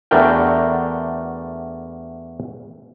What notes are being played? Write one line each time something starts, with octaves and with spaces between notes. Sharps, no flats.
E2 A3 D4 F#4 A#4 G5